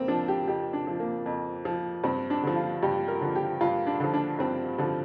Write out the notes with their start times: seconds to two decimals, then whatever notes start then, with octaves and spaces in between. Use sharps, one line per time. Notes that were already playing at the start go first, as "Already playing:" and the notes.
Already playing: F2 A#3 C4
0.08 F3 D4
0.28 G4
0.47 F2 G4
0.73 D4
0.87 F3
1.00 A#3
1.26 F2
1.65 F3
2.04 G2 C4
2.30 D4
2.43 D3 F3
2.56 F4
2.83 G2 G4
3.08 A#4
3.21 D3 F3
3.35 G4
3.61 G2 F4
3.87 D4
4.00 D3 F3
4.14 D4
4.39 G2 C4
4.78 D3 F3